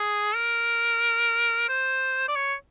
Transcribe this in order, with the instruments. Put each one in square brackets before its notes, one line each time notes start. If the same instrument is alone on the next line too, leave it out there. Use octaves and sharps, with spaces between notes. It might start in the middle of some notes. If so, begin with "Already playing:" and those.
Already playing: [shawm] G#4
A#4
C5
D5
C#5